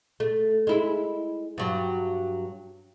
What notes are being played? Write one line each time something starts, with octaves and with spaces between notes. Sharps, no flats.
A3
G#3 E4
G2 F#3